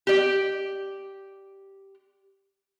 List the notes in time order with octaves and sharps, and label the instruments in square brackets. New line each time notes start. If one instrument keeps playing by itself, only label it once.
[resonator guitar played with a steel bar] G4 D5